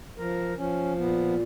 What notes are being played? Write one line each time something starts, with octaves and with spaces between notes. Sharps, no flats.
F3 A#4
F3 C#4
A#2 B3